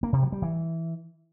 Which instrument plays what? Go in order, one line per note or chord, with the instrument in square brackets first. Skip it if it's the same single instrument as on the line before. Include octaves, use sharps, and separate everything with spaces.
[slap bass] A#3
C3
F#3
G3
E3